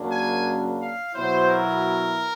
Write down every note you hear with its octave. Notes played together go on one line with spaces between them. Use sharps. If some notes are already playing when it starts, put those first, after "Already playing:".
Already playing: F#2 C#3 F#3 A#3 D4
G#5
F5
B2 F#3 B3 E4 C5
A#4